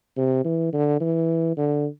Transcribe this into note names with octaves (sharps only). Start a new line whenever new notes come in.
C3
E3
D3
E3
D3